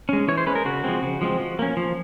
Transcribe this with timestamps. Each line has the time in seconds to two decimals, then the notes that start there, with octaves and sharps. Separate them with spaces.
0.09 G#3 C#4
0.28 E3 C#5
0.38 C5
0.47 G#3 C#4 B4
0.55 A#4
0.65 C#3 F#4
0.84 F3 G#3 C4
1.02 C#3
1.21 F3 G#3 C4
1.39 F3
1.59 A#3 C#4
1.77 F3